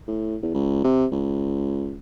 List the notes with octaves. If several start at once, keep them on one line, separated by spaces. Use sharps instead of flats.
A2
E2
C#2
C3
C#2